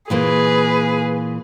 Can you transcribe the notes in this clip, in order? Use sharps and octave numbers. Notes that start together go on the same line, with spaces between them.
A#2 E3 A#3 G#4 B4